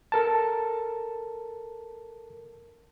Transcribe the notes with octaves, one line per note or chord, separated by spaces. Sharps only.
A4 A#4 A5